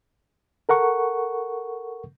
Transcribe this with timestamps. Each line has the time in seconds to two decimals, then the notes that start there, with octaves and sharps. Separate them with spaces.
0.69 A4 A#4 F#5 C#6